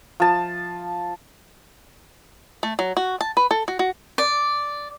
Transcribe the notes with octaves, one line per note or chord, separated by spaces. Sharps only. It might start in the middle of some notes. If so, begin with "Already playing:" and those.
F3 A5
A3
F#3
F#4
A5
B4
A4
F#4
F#4
D5